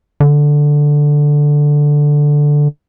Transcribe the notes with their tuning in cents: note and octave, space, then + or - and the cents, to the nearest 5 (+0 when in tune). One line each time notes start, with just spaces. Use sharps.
D3 +0